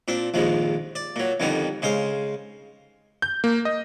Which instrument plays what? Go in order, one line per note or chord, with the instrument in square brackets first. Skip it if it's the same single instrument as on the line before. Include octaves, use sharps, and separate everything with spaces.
[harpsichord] A#2 C4 D4
A#1 D#2 F3 G#3
D5
A#2 F#3
F2 D3 D#3 F3 G3 B3
C#3 G#3 C5 F5
[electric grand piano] G6
A#3
D#5